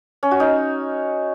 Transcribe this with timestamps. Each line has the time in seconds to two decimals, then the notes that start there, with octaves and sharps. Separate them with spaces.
0.23 C#4
0.31 F#4
0.40 D#4